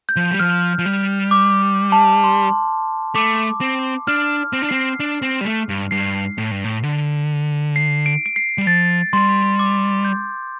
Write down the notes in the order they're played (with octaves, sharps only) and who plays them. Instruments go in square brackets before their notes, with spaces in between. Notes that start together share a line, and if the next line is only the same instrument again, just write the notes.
[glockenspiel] G6
[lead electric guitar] F3
G3
[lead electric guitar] F3 [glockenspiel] F6
[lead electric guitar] F3
G3
[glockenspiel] D6
A5
C6
[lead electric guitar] A3 [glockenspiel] D6
[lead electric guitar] C4
[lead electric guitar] D4 [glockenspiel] F6
[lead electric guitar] C4
D4
[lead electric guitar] C4 [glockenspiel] C7
[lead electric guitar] D4
C4
G3
A3
G2
[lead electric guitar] G2 [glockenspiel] C7
[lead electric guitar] A2
G2
A2
D3
[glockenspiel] C7
D7
D7
C7
[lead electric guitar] G3
[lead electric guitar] F3 [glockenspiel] A6
[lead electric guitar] G3 [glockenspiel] C6
[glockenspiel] D6
G6